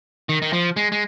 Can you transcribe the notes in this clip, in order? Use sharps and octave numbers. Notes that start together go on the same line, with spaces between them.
D#3
D#3
F3
G#3
G#3